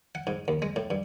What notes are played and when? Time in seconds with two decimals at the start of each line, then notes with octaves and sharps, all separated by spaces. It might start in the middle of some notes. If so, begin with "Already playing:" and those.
0.15 F#5
0.27 G#2
0.48 D#2
0.62 G#3
0.76 A2
0.90 G2